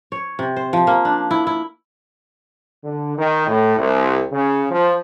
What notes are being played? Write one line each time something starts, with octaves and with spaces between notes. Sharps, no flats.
C#5
C3
C5
F3
A#3
D4
E4
E4
D3
D#3
A2
C2
C#3
F3